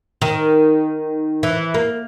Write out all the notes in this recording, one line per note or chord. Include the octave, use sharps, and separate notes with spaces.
D#3
E3
A#3